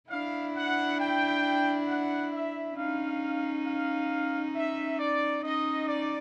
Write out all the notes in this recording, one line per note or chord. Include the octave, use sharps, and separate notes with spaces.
D4 E4 F5
F#5
G5
F#5
E5
C#4 D#4 F5
F5
E5
D5
C#4 D#4 D#5
D5